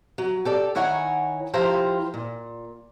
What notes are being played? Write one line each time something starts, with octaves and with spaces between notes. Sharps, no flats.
F#3
G4 A4 D5
D#3 E4 C#5 F#5 G#5 A#5
F3 E4 G4 C5 F5 A#5
A#2